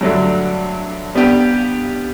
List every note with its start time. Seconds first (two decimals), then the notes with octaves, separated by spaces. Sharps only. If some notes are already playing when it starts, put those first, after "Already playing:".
0.01 G2 D3 F#3 A3 D4
1.15 G3 B3 D4 G4